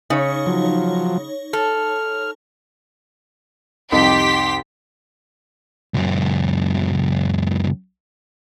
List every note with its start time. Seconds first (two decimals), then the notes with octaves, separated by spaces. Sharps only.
0.10 C#3 D#4 C#5
0.46 F3 F#3
1.53 A4 F6
3.92 C2 F2 D#4 G4 C6 B6
5.94 C#2 F#2